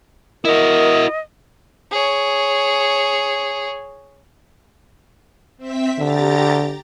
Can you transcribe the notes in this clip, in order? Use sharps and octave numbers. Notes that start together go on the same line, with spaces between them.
E4 F#4 A#4 D#5
G#4 C#5
C4 E5 B6
D3 G4 A#5 A6